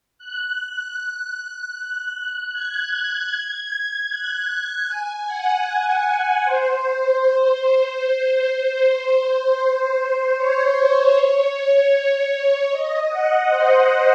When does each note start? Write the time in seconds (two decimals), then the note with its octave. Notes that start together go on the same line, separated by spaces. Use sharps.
0.18 F#6
1.75 F#6
2.53 G#6
3.31 G#6
4.09 F#6
4.88 G#5
5.27 F#5
6.45 C5
8.79 C5
10.37 C#5
11.15 C#5
12.71 D#5
13.10 F#5
13.49 C5